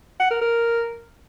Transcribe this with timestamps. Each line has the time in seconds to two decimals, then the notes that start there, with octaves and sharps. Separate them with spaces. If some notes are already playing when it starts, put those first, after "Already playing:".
0.20 F#5
0.31 A#4
0.41 A#4